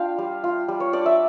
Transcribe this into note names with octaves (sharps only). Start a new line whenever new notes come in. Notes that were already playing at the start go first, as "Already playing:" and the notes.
Already playing: D4 F4 F5 G5
G3
F4
G3
C#5
D4 D5
E5